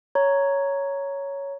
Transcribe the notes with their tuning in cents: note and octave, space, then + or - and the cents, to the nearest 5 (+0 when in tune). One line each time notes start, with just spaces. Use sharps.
C#5 +5 A#5 +0